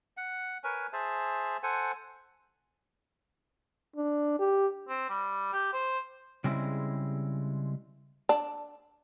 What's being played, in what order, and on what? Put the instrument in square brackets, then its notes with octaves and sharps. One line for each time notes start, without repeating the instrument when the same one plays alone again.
[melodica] F#5
A#4 B4 C#5 G#5
G#4 C5 E5 A5
A4 C5 F#5 G#5
[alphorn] D4
G4
[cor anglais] C4
G3
G4
C5
[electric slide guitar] C#3 G3 G#3 C4 E4
[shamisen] D4